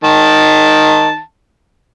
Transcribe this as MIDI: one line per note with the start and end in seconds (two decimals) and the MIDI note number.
0.04 1.19 51
0.04 1.19 81